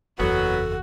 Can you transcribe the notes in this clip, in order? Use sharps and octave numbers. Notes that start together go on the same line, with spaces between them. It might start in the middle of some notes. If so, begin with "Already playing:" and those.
F#1 E2 F#3 B3 F#4 A4